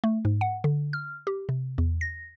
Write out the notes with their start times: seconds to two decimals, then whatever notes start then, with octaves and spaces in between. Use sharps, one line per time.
0.04 A3
0.25 G#2
0.41 F#5
0.64 D3
0.93 F6
1.27 G4
1.49 C3
1.78 E2
2.01 A#6